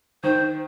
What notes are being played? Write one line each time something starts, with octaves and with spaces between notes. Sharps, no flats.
D#3 C5